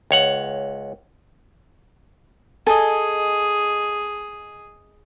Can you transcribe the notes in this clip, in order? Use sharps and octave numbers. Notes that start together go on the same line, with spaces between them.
C#2 C#5 F#5
G#4 A4 D#5 G#5